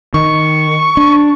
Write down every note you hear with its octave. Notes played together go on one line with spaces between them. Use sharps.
D#3 C#6
D4